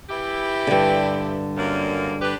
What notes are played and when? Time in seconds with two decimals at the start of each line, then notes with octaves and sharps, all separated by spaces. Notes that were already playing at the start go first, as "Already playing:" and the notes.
0.08 E3 E4 G4
0.67 G2 D3
1.56 F#2 A#3
2.21 D4 G4 B4